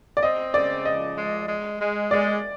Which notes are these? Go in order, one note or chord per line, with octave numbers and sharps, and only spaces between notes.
D5
C4 D#5
C#3 D5
F3 D#5
G#3
G#3
G#3
G#3 D5